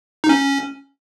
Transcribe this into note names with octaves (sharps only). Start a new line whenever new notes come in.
D#4
C#4